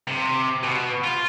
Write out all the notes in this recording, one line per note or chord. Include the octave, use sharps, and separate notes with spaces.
C3
B2
F4